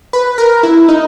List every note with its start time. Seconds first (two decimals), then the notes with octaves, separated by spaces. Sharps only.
0.13 B4
0.38 A#4
0.63 E4
0.88 D#4